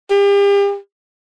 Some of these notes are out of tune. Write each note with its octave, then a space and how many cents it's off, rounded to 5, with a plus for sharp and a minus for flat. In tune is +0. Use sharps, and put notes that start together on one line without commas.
G4 +40